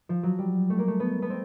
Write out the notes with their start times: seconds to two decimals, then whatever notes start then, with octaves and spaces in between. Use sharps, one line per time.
0.09 F3
0.23 F#3
0.39 G3
0.70 A3
0.79 A#3
0.88 A3
1.00 B3
1.22 B3
1.30 C4